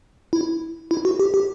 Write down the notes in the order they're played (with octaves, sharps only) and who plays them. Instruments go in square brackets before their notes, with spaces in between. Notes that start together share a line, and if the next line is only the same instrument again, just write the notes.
[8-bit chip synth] E4
E4
F#4
G4
G4